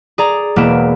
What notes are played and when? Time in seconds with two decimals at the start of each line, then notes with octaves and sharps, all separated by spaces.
0.18 G#4 D5 A#5
0.56 E1 A#3 B3 D7 E7